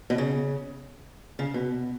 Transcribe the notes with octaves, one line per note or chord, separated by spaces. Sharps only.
B2
C#3
C#3
B2